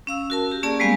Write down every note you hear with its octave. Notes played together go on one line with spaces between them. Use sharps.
C#4 F5 E6
F#4 A#4 A5
G4
A#3 C#4 G#4 D5 A5
G3 G#3 A#3 B3 F5 G#5